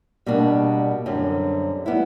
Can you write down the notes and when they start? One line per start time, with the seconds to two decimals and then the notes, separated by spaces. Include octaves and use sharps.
0.26 B2 G3 A#3 D4
1.06 F#2 D3 G3 C4
1.86 G3 B3 E4